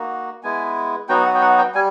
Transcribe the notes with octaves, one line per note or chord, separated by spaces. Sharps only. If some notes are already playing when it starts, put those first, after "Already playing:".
Already playing: A#3 D#4 F#4
G#3 B3 E4 G#5
F#3 B3 D#4 F#4 G5
F#5
G5
F#5
G5
G3 G#5